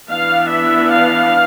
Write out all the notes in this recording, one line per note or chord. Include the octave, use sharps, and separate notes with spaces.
E3 B3 D4 F5
E5
F5